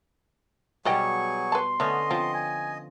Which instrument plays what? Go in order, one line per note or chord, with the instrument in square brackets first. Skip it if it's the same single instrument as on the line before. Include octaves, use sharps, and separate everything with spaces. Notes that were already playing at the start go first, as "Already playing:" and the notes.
[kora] B2 G3 [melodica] F#3 G#4 C#6 [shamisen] B4 D#5 G5
[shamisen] B4 A5 [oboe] C6
[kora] D3 B3 C#4 [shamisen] A3 [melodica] D#5
[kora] F3 [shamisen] C4 F4
[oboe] G#5